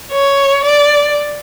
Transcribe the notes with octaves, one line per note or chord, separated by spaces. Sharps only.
C#5
D5